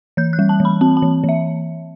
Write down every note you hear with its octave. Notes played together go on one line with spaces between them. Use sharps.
E3 G6
F#6
G3
A5
E3
B5
C4 A5
A5
E3
E3
E5